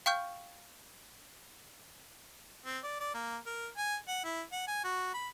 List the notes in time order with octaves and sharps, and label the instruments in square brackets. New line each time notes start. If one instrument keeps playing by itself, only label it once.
[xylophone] F5 G5 C#6 F6 G6
[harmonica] C4
D5
D5
A#3
A#4
G#5
F#5
E4
F#5
G#5
F#4
B5